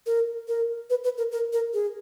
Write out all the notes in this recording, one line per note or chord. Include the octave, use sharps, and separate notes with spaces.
A#4
A#4
B4
B4
A#4
A#4
A#4
G#4